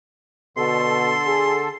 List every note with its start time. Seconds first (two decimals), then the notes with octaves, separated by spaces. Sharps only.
0.57 B2 D3 A4 C6
1.27 G#4